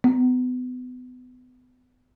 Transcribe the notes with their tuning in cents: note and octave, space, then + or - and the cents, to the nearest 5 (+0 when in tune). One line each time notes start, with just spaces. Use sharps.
B3 +30